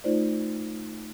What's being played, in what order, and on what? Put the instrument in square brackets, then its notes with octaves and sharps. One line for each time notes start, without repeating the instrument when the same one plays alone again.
[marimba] A3 D#4 F4 C5 D5